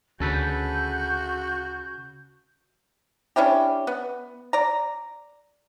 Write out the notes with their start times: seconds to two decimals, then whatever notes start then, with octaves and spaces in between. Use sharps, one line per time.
0.20 D2 C#3 F#4 A4 B4 G6
3.36 C#4 D4 E4 G4
3.87 B3
4.53 D5 A#5